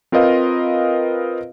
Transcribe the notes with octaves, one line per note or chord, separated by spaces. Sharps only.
C4 F4 A#4 B4 D#5 F5